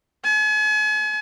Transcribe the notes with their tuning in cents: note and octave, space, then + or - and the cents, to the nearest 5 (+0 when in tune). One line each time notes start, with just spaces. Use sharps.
G#5 +40